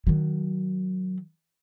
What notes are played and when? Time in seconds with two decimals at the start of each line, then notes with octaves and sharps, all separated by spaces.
0.07 D#3 F#3